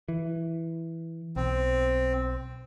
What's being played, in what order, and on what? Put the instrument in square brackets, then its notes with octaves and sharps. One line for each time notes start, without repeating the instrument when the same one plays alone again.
[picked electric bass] E3
[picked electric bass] B1 [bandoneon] C4